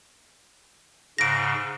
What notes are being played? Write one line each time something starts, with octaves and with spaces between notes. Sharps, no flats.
G#2 C#3 A#6 D7